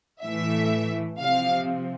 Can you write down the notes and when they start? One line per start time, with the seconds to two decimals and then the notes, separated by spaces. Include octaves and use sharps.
0.23 A2 E3 A3 E5
1.19 C3 F3 C4 F5